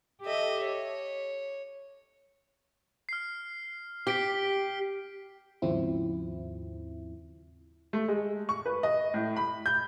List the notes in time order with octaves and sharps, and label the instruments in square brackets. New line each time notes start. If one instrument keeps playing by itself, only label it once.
[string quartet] G4 A4 D#5 E5
C#5
[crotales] F6 C7
[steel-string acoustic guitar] G4 [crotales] B6 D7 G7
[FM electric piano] D#2 G#2 C#3 F3 C4 E4
[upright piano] A3
G#3
C#6
B4
D#5
A2
B5
G6